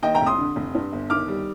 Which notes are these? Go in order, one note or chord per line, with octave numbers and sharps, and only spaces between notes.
D#2 D#5 G5
G5 A#5
F1
C6 D#6
D3
F1
G2
G1
D#3 D6 F6
G3